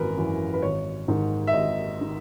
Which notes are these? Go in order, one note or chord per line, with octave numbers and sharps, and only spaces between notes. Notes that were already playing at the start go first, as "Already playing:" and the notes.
Already playing: G#1 F#2 E3 A#4 B4
F#2 E3
B4
G#1 C#5
G#2 D#3
E5
G#1 D#5
D#3